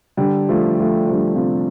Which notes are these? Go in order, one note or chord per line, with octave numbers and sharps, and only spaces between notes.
D3 G3
F3 A3
F3 A3
F3
D3 G3
C3 F3